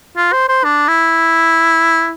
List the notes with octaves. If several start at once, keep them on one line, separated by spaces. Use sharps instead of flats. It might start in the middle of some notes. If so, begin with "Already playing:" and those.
F4
C5
C5
D4
E4